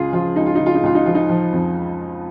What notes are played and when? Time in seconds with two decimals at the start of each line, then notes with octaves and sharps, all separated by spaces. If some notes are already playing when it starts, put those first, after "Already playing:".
Already playing: C#2 C#3 F4 G#4
0.12 F3 F4
0.36 C#2 D#4
0.46 F4
0.55 C#3 D#4
0.66 F4
0.75 D#4
0.83 C#2 F4
0.95 D#4
1.06 F3 F4
1.15 D#4
1.29 F3
1.52 F2